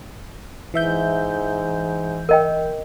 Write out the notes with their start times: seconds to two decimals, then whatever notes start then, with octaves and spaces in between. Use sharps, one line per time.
0.74 G#2 E3 E5 G6
2.29 A#4 D#5 G5